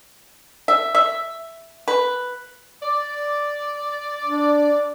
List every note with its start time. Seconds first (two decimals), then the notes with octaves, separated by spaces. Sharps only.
0.68 E5
0.95 E5
1.88 B4
2.83 D5
4.24 D4